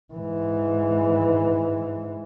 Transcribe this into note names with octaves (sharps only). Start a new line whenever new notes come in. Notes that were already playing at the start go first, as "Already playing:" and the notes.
G#2 E3